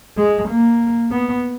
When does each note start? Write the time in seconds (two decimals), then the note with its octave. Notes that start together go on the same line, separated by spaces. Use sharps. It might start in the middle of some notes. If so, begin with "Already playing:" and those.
0.17 G#3
0.49 A#3
1.12 B3